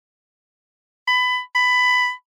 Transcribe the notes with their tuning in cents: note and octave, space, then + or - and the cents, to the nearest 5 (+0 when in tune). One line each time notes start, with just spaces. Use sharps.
B5 +20
B5 +15